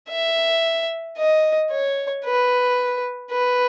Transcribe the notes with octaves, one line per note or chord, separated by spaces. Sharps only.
E5
D#5
C#5
B4
B4